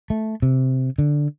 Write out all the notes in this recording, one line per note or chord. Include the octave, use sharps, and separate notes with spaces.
A3
C3
D3